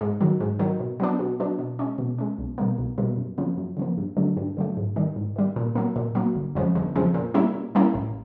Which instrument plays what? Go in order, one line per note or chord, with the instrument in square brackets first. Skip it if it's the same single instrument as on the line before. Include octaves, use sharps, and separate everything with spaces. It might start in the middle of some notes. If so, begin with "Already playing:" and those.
[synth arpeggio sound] G#2
D#3 F#3
G#2
D#3 F#3
B2
F#3 B3 D4
B2
F#3 B3 D4
B2
G#3 C#4
B2
G#3 C#4
B1
B2 G3 A#3
B1
B2 G3 A#3
F#2
C#3 F3 A#3
F#2
C#3 F3 A#3
G2
D3 F#3 A3
G2
D3 F#3 A3
G#2
D#3 G3
G#2
D#3 G3
A#2
F#3 A#3
A#2
F#3 A#3
G1
F2 C#3 F3 G#3
G1
F2 C#3 F3 G#3
A#2
G3 A#3 C#4 E4
A#2
G3 A#3 C#4 E4
A1